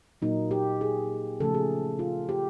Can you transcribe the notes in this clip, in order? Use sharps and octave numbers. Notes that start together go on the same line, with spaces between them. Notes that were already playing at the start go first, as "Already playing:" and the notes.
A#2 F#3 A#3 D#4
G4
G#4
C#3 F3 A3 A4
G#4
F4
G4